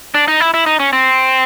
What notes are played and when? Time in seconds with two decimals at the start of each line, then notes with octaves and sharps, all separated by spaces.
0.15 D4
0.28 D#4
0.40 E4
0.54 E4
0.66 D#4
0.80 C#4
0.93 C4